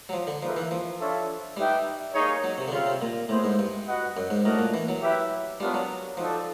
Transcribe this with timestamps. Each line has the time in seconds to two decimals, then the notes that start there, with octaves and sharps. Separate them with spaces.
0.09 F#3
0.13 F3
0.27 D3
0.42 F3 A#3 D#4 G#4 B4 E5
0.57 E3
0.71 F3
1.00 D4 F4 A4 C#5 E5
1.57 G3 D#4 G4 B4 E5 G5
2.14 A#3 D#4 G#4 C#5
2.44 F#3
2.58 C3
2.68 D3
2.72 C#3 G3 C4 F4
2.86 C3
3.02 A#2
3.29 A2 B3 E4 G#4 C5
3.44 G#2
3.59 G2
3.87 F#4 B4 D#5 F#5
4.17 F#2
4.30 G#2
4.44 A2 D4 F#4 A#4 D#5
4.59 A#2
4.74 E3
4.88 F#3
5.02 E4 G4 B4 E5
5.60 G3 B3 D4 F4 A#4 C#5
5.74 F#3
6.17 F3 D#4 F#4 A4 D5